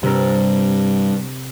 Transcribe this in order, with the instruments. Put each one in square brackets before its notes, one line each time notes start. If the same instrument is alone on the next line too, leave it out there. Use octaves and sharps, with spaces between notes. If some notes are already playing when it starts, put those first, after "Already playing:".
[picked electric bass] G2 [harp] C3 A#4